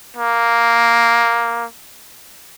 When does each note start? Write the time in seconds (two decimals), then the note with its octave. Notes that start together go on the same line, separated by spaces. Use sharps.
0.17 A#3